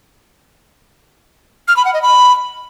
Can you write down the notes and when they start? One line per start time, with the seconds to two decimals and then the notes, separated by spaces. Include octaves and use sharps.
1.68 F6
1.77 B5
1.85 F#5
1.94 D#5
2.02 B5